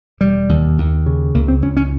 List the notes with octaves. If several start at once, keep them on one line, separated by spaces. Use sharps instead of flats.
E1 G3
D#2
D#2
C#3
C#2 A#3
C4
C#2 C#4
C#4